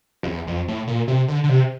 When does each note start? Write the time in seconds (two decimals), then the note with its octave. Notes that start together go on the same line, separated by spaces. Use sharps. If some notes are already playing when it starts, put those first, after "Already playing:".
0.23 F2
0.27 E2
0.47 F2
0.68 A2
0.87 A#2
1.08 C3
1.28 D3
1.44 D3
1.49 C3